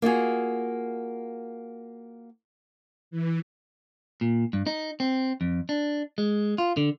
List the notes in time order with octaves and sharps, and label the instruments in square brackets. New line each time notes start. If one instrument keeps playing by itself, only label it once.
[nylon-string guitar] A#3 F4 F#4 G#4
[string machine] E3
[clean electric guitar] A#2
G2
D#4
C4
F2
D4
G#3
F4
D3